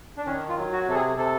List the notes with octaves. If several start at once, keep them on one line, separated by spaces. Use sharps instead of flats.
D4
D#3 C#4
F4
F#3
F#4
C3 A4
G#4
C3 A4